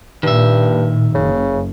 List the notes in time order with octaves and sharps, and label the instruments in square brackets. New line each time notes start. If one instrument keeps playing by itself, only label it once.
[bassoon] G2 [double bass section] A#2 [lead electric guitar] D#3 E5
[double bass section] F#1 [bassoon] C#3